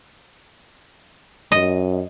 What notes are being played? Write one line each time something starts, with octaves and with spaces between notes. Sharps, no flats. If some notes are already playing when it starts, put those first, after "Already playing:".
F#2 D#5